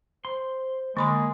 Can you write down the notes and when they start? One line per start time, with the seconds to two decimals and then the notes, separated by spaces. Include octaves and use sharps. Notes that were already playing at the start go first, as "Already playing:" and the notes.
0.25 C5 C6
0.97 D3 G#3 A#3 B5 C#6